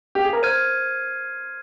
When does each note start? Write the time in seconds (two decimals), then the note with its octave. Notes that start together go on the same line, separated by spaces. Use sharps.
0.15 G4
0.25 G#4
0.33 A#4
0.42 C5 F6 G#6 D#7